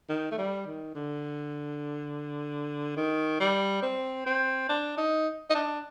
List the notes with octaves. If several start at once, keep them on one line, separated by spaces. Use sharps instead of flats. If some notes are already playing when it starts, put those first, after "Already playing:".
D#3
A3
G3
D#3
D3
D#3
G3
C4
C4
D4
D#4
D#4
D4